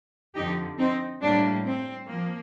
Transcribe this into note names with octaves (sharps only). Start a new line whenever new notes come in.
F2 D3 F3 D#4 G4
C4 D#4
A2 G3 A#3 D4
C4
F3 A#3